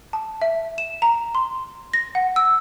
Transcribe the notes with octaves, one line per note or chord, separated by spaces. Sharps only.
A5
E5
E7
A#5
C6
A#6
F#5
E6